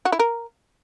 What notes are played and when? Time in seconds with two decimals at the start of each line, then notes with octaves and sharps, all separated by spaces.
0.05 F#4
0.12 E4
0.19 A#4